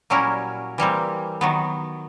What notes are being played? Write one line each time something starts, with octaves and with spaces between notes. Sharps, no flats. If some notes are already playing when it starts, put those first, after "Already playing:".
A#2 F#3 G3 C#4 E4 A#4
E3 G3 A#3 C4
D#3 F#3 B3